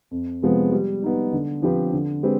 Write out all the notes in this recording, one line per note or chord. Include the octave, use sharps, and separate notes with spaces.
F2
C3 F3 G#3 B3
G3
B3 D#4
D3
F3 C4 G4 B4
D3
G#3 C4 G4 B4